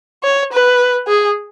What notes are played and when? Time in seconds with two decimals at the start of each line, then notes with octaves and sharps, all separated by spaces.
0.23 C#5
0.52 B4
1.07 G#4